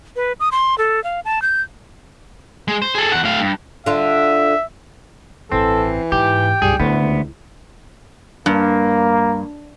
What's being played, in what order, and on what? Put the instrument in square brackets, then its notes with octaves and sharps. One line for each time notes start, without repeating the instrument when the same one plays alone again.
[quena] B4
D#6
C6
A4
F5
A5
G6
[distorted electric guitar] G#3
C5
G#4 A4
E2 F#5
A2 F5
G2
[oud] D3 F4 [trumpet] E5
[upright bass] A1 G2 [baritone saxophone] E3 [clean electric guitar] C4 [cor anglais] A4
[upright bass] G#2 [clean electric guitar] G4 [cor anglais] G5
[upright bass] C#2 G2 [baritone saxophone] G3 [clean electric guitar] G#4
[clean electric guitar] D2 B3 [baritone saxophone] A2 [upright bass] C#4 E4
[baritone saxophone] C#2
[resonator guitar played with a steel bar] G2 [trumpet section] A#3